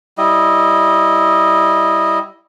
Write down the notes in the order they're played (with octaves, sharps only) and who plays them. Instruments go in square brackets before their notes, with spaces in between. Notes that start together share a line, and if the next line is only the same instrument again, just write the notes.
[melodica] G3 E4 D#5